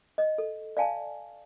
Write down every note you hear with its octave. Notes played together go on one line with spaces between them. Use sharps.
D#5
A4
D5 F5 G#5 A5